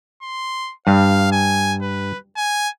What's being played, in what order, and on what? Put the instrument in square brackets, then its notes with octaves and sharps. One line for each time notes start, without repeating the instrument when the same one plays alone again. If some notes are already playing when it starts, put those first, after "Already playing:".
[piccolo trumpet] C6
[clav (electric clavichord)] G2 [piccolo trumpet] F5
[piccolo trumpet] G#5
B4
G#5